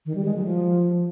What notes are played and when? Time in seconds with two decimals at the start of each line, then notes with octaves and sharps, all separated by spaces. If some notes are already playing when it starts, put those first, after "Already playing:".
0.06 D#3
0.15 G3
0.25 G#3
0.35 F#3
0.44 F3